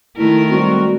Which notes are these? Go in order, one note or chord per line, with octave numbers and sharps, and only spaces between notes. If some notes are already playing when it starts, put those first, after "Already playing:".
D#3 A3 E4 A#4
G3 G#3 C4 F#4